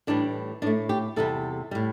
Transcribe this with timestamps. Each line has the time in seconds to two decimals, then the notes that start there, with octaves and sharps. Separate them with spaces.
0.07 A2 E3 G3 D4
0.62 A2 A3 D4
0.89 G4
1.16 E2 C3 G3 A4
1.71 A2 G3